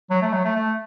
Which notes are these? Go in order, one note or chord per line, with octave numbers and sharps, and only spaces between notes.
F#3
A3
F#3
A3
A3